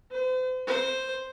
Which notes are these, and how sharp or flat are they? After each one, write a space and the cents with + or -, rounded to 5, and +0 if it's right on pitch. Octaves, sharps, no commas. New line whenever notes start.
C5 -40
C5 +0